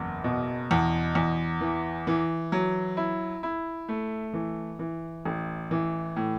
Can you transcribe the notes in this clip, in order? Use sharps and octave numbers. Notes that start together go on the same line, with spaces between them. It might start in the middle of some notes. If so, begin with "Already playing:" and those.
Already playing: F#1 E2
B2
E2
E2
E3
E3
F#3
E4
E4
A3
E3
E3
A1
E3
A2